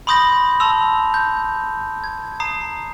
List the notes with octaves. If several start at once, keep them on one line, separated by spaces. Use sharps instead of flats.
B5 C6 D#6 G6 A#6 F#7
A5 C6 E6 F7
G6
G#6
A#5 D#6 C7